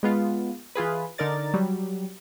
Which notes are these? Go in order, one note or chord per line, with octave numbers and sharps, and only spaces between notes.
G#3 B3 F4
E3 F4 G#4 B4
D3 D#4 A#4 D5 A6
F#3 G3